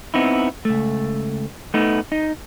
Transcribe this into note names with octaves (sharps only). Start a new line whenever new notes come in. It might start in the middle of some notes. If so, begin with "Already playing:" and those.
B3 C4 D#4 E4
C#2 A3
A3 B3 D#4
D#4